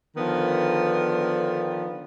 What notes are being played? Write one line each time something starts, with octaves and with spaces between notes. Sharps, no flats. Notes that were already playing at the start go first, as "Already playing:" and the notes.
D3 D#3 F3 B3